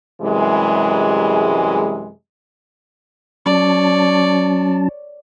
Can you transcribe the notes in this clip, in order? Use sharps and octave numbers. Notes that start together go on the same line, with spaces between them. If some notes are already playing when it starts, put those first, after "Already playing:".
F#2 C3 E3 G3 G#3
F#3 C#4 C#5 D5 A5